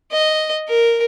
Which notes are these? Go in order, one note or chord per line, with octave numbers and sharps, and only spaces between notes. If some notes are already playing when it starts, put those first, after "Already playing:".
D#5
A#4